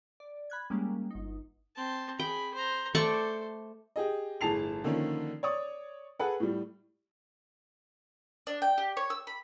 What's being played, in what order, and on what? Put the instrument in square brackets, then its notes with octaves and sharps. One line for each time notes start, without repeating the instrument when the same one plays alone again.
[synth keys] D5
B5 F#6 G#6
G3 G#3 A#3 C#4
G1 D#4
[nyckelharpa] C4 A5
[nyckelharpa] G#4 B5 [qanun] G5
[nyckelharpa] C5 A#5
[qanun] A3 D5 C#6 [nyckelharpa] A4 C5
[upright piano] G4 G#4 D#5
G1 A2 G#4 A5 C7 F7
D3 D#3 F3 A#3 C#4
C#5 D5 C#6 D#6
G#4 A4 B4 F#5
A2 G3
[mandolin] D4
G5
G4
C#5
E6
B5